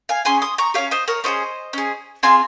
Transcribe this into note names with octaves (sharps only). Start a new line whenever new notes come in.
F5 G#5
C#4 G#4 G#5 C6
C6 D#6
A#5 C#6
C#4 G4 C#5 F5
C5 D#5
A#4 C#5
C#4 F4 G#4 C5 D#5
C#4 G#4
C4 F4 G#4 G#5 C6